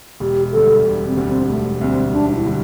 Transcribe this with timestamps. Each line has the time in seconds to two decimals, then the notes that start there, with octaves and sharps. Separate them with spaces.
0.20 E1 G4
0.52 D2 D3 G3 A4
0.85 E1
1.06 C4
1.17 D2 D3 G3
1.28 C4
1.49 E1 A3
1.81 D2 D3 G3 C4
2.13 E1 D4
2.30 D4
2.35 E4
2.46 D3 G3